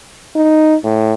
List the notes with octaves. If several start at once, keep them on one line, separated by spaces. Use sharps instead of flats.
D#4
A2